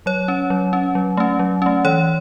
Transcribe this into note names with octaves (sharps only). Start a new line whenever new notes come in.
F#3 C#5
C#4
F#3
C#4
F#3
A3 C#4
F#3
A3 C#4
E3 C#5